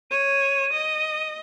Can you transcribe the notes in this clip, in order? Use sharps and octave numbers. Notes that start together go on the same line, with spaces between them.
C#5 D#7
D#5